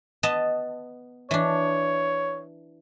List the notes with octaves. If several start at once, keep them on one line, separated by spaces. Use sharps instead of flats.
B3 D#5 A5
E3 D4 C#5